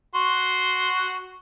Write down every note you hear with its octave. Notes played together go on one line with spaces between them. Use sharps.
F#4 C6